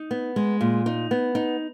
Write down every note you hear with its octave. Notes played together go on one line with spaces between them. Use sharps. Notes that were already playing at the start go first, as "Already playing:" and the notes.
Already playing: D#4
B3
G#3
A#2
D#4
B3
D#4